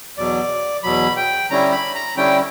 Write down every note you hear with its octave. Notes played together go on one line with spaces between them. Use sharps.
E2 B2 F#3 D5
E2 B2 F#3 B5
G5
D3 G3 C#4 E4 A#5
B5
A#5
D3 G3 C#4 E4 G5